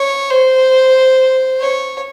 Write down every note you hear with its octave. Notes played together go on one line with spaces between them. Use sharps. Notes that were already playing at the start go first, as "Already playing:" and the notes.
Already playing: C#5
C5
C#5